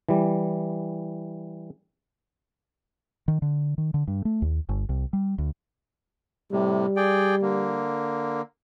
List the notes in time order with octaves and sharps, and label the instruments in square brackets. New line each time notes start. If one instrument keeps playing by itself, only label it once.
[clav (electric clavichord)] E3 G3
[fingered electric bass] D#3
D3
D#3
D3
G2
A3
D#2
G1
C2
G3
D2
[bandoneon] A2 C3 [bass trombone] G3
[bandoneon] G#4 D5 G5
D3 A#3